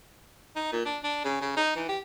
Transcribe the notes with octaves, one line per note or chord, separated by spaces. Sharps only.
D#4
A#2
D4
D4
C#3
C#3
D#4
E3
G4